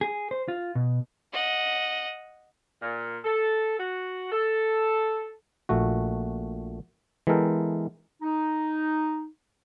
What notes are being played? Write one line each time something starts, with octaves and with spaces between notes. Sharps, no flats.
G#4
C5
F4
B2
D#5 F#5
A#2
A4
F#4
A4
A#1 A#2 A3 F#4
E3 G#3 B3 A4 A#4 G5
D#4